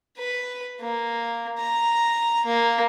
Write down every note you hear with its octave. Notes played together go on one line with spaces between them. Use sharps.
B4
A#3
A#5
A#3